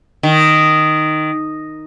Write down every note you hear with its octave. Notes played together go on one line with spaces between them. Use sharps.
D#3